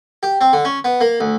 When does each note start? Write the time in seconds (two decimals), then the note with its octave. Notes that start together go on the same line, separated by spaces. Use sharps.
0.23 G4
0.41 C4
0.53 D3
0.65 C#4
0.84 B3
1.01 A#3
1.20 D2